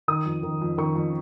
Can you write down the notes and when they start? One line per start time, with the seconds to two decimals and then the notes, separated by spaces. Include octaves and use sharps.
0.08 D#3 D#6
0.26 F2
0.43 D#3
0.62 F2
0.78 D#3 C#6
0.96 F2